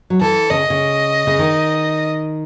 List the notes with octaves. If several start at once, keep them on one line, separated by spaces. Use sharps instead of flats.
F#3
E3 A4
C#3 D#5
C#3
C#3
D#3